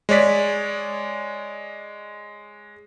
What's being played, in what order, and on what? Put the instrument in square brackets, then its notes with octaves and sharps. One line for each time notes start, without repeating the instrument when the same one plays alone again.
[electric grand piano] G#3 C#5 D5 B6